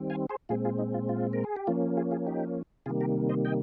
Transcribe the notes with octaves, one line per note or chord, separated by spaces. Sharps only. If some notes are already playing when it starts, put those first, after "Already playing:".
Already playing: D#3 G3 C4
F5 G#5
G#4 C5
A#2 G#3 C4 F4 G#4
F4 G#4
D#4
F4
F4
A#4
G#4
G4
F3 A#3 C#4 F4
F4 G#4
F4 G#4
D#4 G4
C3 D#3 G3 A#3 F4 G#4
G4 A#4
C5 D#5
D#5 G5